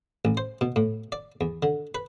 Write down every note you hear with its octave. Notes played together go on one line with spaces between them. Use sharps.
A1
C5
B2
A2
D5
E2
D3
B4